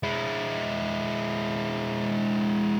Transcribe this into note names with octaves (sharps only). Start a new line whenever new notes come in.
G#3 E4